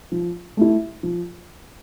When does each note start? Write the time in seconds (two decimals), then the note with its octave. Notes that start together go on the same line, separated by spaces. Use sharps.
0.12 F3
0.57 A3 E4
1.03 F3